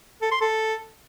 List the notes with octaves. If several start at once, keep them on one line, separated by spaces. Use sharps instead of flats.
A4
C6
A4